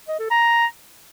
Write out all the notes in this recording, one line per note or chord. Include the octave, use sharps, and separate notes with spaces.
D#5
A4
A#5